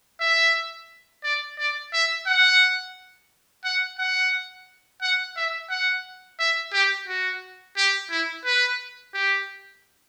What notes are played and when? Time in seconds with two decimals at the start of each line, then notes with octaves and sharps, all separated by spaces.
0.21 E5
1.24 D5
1.59 D5
1.93 E5
2.27 F#5
3.65 F#5
3.99 F#5
5.02 F#5
5.37 E5
5.70 F#5
6.40 E5
6.73 G4
7.08 F#4
7.77 G4
8.11 E4
8.45 B4
9.14 G4